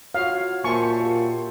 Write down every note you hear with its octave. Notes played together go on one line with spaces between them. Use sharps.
F4 F#4 C#5 F5
A#2 A#3 C5 E5 G#5 A5 C6 C#6
F4 G4